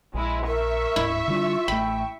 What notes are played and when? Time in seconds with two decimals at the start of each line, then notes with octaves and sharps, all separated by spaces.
0.14 A#1 G#3 E4
0.47 A#4 E5 C#6
0.96 D1 G#1 G#2 E4
1.28 D3 G3 D4 F4
1.68 A1 A3 G5 B5